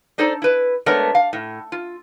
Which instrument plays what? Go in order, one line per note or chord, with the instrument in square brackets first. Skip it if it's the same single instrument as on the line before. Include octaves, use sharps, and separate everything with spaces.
[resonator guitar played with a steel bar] D4 D#4 A4 C5 D5
E4 B4
G#3 A3 B3 D4 A#4 C#5
F5
A2
F4